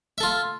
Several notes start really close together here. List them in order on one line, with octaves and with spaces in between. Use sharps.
E5 A4 F4